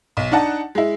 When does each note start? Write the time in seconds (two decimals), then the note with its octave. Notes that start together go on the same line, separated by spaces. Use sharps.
0.17 B1
0.32 D4 D#4 F#5 A5
0.75 G#3 E4